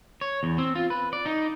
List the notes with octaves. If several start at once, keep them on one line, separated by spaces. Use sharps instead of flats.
C#5
E2
C4
F4
B4
D5
D#4